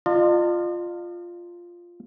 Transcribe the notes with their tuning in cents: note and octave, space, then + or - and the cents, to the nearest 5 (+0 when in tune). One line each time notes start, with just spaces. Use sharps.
F4 +0 D#5 -45 A5 +45